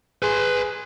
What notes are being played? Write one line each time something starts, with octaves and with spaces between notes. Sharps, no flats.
G#4 B4 C6